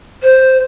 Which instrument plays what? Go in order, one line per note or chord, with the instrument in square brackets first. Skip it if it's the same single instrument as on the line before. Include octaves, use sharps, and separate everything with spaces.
[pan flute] C5